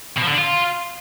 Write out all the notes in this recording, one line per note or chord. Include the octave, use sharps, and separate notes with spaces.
B2
F3
D3
D4
F4